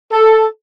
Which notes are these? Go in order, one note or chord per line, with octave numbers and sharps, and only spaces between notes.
A4